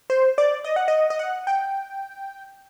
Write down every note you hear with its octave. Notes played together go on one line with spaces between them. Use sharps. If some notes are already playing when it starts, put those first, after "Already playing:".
C5
D5
D#5
F#5
D#5
D#5
F#5
G5